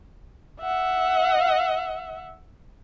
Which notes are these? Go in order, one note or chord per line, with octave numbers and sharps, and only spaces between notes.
E5 F#5